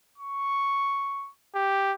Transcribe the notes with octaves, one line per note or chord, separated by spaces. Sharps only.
C#6
G4